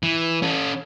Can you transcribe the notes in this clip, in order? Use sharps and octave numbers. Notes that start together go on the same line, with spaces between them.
E3
C#4 A4